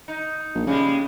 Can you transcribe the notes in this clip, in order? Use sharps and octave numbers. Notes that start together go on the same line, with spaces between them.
D#4
A#1
C#3 G3 G#3